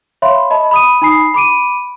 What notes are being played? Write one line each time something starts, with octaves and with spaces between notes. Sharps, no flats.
C#5 E5 F5 B5 C6
D#5 A5 B5
B5 D#6 D#7
D#4 G#5 B5 D#6 C7
B5 D6 D7 D#7